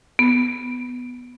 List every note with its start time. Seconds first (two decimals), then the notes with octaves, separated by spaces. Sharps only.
0.19 B3